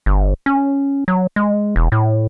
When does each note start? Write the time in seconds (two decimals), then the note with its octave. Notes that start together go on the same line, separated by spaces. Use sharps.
0.06 G1
0.46 C#4
1.08 F#3
1.36 G#3
1.76 E1
1.92 A2